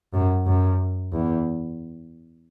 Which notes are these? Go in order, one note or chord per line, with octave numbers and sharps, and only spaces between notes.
F#2
F#2
E2